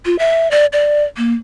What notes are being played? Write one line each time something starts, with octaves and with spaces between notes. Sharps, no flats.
F4
E5
D5
D5
A#3